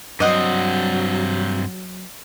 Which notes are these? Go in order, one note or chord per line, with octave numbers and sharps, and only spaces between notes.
G2 F#3 C4 D#5 F#5